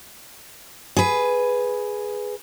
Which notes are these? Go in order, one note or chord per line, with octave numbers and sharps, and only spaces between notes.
G#4 B4